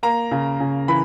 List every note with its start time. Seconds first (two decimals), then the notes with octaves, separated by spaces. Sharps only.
0.03 A#3 A#5
0.31 C#3
0.60 C#3
0.88 E3 B5